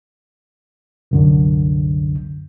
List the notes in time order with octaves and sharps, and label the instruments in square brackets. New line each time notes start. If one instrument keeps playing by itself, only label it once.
[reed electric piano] C2 F#2 D3